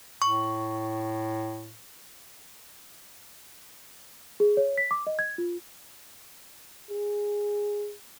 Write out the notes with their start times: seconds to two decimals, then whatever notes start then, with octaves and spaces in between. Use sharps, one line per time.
0.22 A2 C#6
4.40 G#4
4.57 C#5
4.78 B6
4.91 D6
5.07 D#5
5.19 G#6
5.38 F4
6.90 G#4